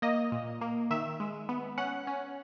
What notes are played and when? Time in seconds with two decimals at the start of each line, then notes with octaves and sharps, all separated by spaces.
0.02 A#3 D#5
0.32 A#2
0.61 A#3
0.90 D#3 E5
1.20 G#3
1.49 B3
1.78 C#4 F#5
2.07 C#4